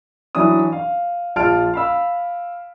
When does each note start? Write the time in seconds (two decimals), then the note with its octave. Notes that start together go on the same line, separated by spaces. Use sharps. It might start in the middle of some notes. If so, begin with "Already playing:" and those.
0.35 E3 F#3 D4 D#6
0.72 F5
1.36 A#1 F4 A5 F6 D7
1.74 F5 B5 E6